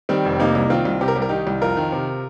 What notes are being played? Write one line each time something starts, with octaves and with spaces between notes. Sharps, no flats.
D#3 G3 C4
F1
C3 A#3 D#4
C2
D#3 C4 F4
C2
C3 G4
A#4
C2 G4
A#4
D#3 D#4 G4
C2
F2 F4 A#4
D#3
C3